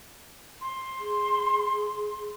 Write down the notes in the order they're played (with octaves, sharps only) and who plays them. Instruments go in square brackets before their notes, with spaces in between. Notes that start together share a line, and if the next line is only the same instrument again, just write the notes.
[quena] C6
[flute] G#4